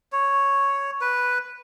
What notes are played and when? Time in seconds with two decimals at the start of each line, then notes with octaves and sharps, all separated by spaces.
0.12 C#5
1.01 B4